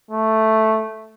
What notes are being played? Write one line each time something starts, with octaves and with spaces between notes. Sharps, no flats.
A3